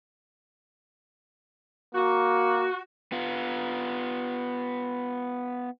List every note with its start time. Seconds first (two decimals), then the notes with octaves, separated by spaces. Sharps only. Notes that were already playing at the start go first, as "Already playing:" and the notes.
1.95 A#3 F#4
3.12 B3 F4